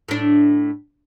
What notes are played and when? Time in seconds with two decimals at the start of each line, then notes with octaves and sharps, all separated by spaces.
0.08 A2 D4